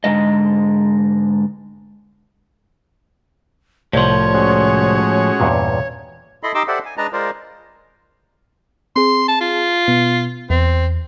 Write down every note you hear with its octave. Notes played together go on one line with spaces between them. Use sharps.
G#2 D3 G#3 D#5
C2 A2 F3 C#5
G#3 C#4 F#4
E2 G2 A#2
E4 A4 D#5 B5 C6
D#4 G4 D#5 C6 D6 E6
G4 A4 C5 D5 E5 F#5
G#5
G#3 D4 B4 D#5 A5 A#5
G#3 F4 A#4 C5 D5
C4 G#4 C6
A5
F4
B2 B3
E2 C4